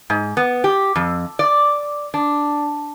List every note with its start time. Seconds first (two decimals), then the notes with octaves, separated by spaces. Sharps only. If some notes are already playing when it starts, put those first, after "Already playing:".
0.10 G#2
0.37 B3
0.64 G4
0.96 F2
1.39 D5
2.14 D4